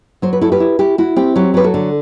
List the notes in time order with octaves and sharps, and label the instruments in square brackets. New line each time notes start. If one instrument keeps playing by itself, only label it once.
[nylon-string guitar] F#3 C5
B4
E4 A4
G4 B4
E4
E4 G4
E4 F#4
C4 G4
F#3 G4
F#3 B4
F#4 A4
D3